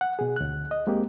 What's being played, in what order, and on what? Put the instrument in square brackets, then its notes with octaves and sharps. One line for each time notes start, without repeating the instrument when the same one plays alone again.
[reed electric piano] F#5
B2 G#4
D2 F#6
D#5
G#3 A#3 C4 G4